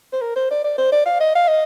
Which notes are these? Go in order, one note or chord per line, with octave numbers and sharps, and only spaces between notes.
C5
A#4
C5
D5
D5
C5
D5
F5
D#5
F5
D#5